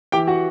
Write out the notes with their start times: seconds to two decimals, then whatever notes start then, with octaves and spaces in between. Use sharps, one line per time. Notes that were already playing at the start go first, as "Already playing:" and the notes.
0.12 E3 G4 G5
0.28 F#4 F#5